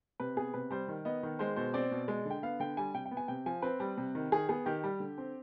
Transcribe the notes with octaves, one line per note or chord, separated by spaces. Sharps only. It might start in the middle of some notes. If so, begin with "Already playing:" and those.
C3 B4
B3 G#4
C3 B4
G3 C5
D#3
B3 D#5
D#3
G#3 C5
B2 C5
C4 D5
B2
G#3
D3 G5
B3 F5
D3 G5
G3 G#5
C3 G5
G5
B3
G#5
C3 G5
F3 G#5
C4 B4
G3
C3
D#3
D#3 G#4
B3 G#4
D#3 G4
G3
D3
C4